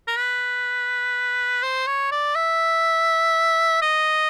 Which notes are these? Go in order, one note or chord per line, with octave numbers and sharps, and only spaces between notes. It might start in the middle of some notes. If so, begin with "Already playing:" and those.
A#4
B4
C5
C#5
D5
E5
D#5